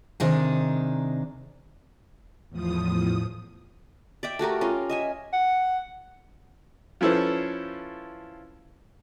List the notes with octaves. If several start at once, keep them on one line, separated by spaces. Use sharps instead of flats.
C3 D#3 D4 D#4 G#4
E2 A2 F3 D#6
D5 E5 G5
A3 F#4 G4 A#4
C#4 F4 A#4
D#5 E5 G#5
F#5
F3 C#4 E4 A4 B4 C5